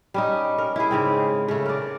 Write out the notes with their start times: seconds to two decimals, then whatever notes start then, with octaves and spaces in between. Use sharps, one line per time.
0.14 G3 C#4 D#4
0.58 A#4
0.76 E4 G#4
0.91 G#2 C#3 C4
1.48 C#3 A3
1.66 A#4 D5